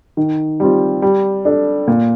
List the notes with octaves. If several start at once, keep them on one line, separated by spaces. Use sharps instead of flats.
D#3
G3 C4 F4
G3
D4 A4
A#2